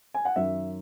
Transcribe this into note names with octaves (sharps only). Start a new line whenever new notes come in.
G#5
F#5
F#2 D#3 F#3 E5